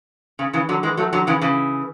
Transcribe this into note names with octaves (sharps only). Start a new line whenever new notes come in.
C#3
C#3 E3
D3 F#3
E3 G#3
F#3 A3
D3 F#3
C#3 E3
C#3 E3